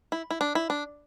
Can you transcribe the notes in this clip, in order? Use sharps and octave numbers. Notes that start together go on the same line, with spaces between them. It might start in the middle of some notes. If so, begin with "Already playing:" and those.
E4
E4
D4
E4
D4